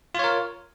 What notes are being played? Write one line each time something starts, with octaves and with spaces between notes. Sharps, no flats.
F4 A#4 C#5